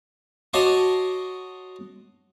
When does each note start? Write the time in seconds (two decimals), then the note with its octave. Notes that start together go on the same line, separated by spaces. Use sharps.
0.54 F#4 C#5 D#5 A5 C6 D6